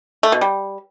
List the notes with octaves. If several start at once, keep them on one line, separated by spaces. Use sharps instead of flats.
A3
B2
G3